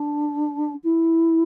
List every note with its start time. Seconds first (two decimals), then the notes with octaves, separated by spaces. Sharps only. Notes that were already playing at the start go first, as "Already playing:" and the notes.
Already playing: D4
0.84 E4